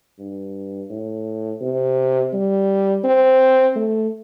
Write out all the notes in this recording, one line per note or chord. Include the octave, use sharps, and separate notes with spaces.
G2
A2
C3
G3
C4
A3